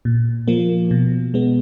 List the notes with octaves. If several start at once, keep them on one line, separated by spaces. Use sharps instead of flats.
A#2
F3 A#3
B2
G#3 B3